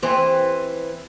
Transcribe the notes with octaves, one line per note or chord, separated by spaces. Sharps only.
E3 C4 G4